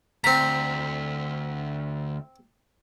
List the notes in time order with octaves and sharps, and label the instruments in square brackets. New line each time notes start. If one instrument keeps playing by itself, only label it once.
[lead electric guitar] D2 [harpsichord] C4 A#5 [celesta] B6